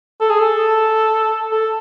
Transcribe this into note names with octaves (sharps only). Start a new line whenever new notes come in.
A4
G#4
A4
A4